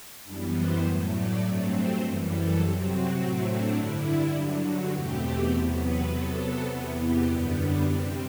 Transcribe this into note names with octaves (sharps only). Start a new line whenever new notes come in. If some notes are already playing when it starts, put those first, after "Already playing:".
F#2 E3 G3 B3 D4
C5
A2 F#3 A3
D5
G2 F#3 A3 C4
C5
F#2 E3 G3
A4
C3 F#3 C4 G4
F#4
A2 F#3 A3 C4 F#4
D4
G2 D3 G3 E4
G2 D3 F#3
F#4
E2 B2 A3 C4 G4
E2 C3 F#3 B3 C5
B4
C3 F#3 B3 A4
E2 C3 E3 B3
G4
F#2 D3 G3 B3 E4
D4
C3 G3 C4 E4